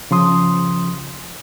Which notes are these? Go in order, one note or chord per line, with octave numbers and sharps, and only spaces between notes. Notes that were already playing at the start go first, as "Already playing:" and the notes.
C#3 F3 C6 D#6